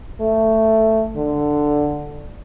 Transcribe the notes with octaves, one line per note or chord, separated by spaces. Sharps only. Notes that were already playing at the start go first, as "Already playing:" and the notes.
A3
D3